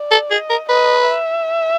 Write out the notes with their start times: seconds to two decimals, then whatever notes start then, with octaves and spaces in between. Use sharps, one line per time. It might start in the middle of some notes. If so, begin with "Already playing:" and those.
Already playing: D5
0.11 A4
0.31 G#4 D#5
0.50 A#4
0.69 B4 D#5
1.08 E5